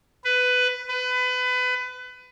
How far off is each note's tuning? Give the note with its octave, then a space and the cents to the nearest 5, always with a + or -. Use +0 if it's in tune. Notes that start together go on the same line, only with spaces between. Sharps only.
B4 +15
B4 +25